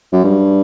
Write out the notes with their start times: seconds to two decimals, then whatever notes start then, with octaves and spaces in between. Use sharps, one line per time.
0.13 F#2
0.24 G2